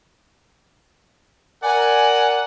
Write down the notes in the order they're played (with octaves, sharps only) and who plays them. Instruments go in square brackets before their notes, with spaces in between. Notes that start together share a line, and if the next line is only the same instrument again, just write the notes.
[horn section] A#4 D5 F#5 [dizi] G#5